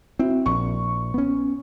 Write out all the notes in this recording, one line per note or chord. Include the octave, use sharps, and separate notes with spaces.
C4 E4 F#4
A#1 C#6
B3 C#4